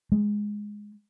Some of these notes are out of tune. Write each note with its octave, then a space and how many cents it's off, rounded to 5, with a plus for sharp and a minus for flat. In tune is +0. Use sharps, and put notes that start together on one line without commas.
G#3 +0